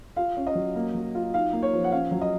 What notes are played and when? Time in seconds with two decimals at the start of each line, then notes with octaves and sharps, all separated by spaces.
0.17 F4 F5
0.37 C#4
0.47 D#5
0.55 F#3
0.76 A#3
0.94 F#3
1.15 F4
1.34 D#4 F5
1.53 A#3
1.63 C#5
1.73 F3
1.84 F#5
1.92 C#4 F5
2.11 F#3
2.21 D#5